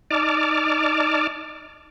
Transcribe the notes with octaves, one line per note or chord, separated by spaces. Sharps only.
D#4 D5 A5 D6 F6